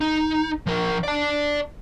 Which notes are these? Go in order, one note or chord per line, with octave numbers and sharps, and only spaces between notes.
D#4
F3 A#4
D5 A5